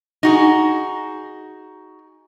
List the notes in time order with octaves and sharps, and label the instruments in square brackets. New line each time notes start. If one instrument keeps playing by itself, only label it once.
[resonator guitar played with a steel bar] D#4 F#4 G#4